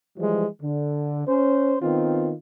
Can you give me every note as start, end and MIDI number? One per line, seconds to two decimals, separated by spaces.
0.17 0.46 52
0.17 0.46 53
0.17 0.46 55
0.17 0.46 56
0.63 1.26 50
1.27 1.76 61
1.27 1.76 72
1.82 2.33 51
1.82 2.33 59
1.82 2.33 60
1.82 2.33 65